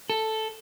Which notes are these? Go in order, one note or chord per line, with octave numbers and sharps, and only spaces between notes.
A4